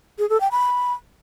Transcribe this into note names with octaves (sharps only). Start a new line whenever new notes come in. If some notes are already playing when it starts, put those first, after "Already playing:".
G#4
A4
G5
B5